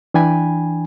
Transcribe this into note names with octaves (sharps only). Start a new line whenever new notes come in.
E3 D4 G5 G#5 B5